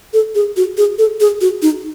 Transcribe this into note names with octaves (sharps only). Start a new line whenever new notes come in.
A4
G#4
F#4
G#4
A4
G#4
F#4
D#4